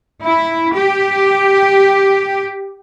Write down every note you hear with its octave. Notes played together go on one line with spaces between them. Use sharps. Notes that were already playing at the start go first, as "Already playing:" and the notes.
E4
G4